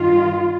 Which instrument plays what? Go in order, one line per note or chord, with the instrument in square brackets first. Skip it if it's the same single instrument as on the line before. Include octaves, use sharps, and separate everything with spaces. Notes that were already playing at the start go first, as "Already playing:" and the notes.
Already playing: [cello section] G2 D#3 F4